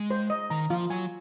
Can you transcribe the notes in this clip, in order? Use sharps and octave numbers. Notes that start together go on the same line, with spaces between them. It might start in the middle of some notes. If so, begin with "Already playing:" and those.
Already playing: G#3
C5
D#5
D#3 A#5
F3 F4
F#3 G#5